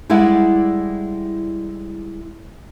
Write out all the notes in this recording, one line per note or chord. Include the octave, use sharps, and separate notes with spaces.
G3 G#3 E4 D5 F#5